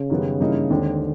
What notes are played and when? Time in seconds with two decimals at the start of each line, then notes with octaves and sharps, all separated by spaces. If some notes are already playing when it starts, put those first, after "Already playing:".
Already playing: C#3
0.10 F#2 D#3 G3 B3
0.40 G2 E3 G3 A#3 D#4
0.70 D#2 D3 D#3 G#3 C4